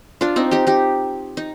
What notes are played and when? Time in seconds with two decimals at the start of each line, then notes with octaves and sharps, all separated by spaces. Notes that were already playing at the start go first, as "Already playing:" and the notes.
0.21 D4 F4
0.36 C4 D#4
0.51 D#4 G4
0.67 D#4 G4
1.37 D#4